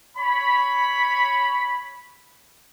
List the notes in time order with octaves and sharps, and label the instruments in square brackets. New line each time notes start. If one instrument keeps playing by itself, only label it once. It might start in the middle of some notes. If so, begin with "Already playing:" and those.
[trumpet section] C#5 B5